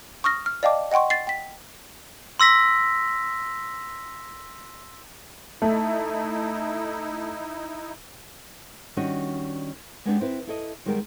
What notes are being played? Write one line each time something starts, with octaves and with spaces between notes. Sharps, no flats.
C#6 D#6 F6 A#6
F6
D5 D#5 F5 G5 A5 D6
D#5 F#5 G5 C6 C#6
A6 C7
G5 B6
C6 E6 A#6 B6
A3 D#4 E4
D#3 G3 C#4 D4 F#4 D#5
G#3 B3 D4 G4
C4 E4 B4
E4 A4 D#5
D#3 G3 G#3 B3 A#4